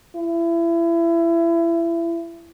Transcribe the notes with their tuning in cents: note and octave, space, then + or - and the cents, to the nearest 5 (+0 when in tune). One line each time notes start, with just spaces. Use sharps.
E4 +30